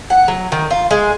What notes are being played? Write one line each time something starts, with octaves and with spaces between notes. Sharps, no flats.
F#5
F#3
D#3
F4
G#3